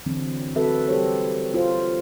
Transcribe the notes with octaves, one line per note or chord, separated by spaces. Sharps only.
D3 E3 F#3 C4 D4
F#3 C4 F#4 A4 B4 E5
G3 G4 A4 C5 C#5
F4 C5